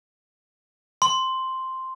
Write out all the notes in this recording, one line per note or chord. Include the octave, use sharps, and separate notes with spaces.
C6